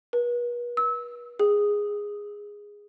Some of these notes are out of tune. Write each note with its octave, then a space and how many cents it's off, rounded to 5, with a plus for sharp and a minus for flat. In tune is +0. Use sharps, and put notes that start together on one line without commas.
B4 -40
E6 -25
G#4 -10